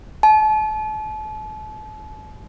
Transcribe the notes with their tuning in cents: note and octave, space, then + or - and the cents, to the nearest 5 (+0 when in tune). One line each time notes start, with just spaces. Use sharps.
A5 -35